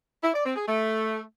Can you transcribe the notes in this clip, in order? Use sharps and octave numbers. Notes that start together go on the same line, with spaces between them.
E4
D5
C4
G#4
A3